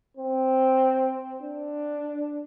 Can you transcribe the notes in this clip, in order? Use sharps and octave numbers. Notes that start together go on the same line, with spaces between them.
C4
D4